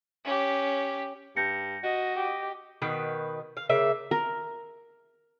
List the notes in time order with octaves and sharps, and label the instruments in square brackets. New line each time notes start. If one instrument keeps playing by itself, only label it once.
[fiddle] C#4 G4
[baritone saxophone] G2 [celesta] G6 A#6 C#7
[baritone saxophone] F#4 [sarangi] D#5
[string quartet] G4
[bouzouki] B2 D#3 B4
F5
C#3 A#3 E5
[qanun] A#4